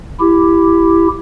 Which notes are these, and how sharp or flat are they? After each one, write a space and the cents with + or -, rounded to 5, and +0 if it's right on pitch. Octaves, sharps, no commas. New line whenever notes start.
E4 +15 G4 +0